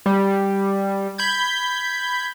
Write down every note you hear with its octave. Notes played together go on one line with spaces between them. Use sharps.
G3
B5 G6 G#6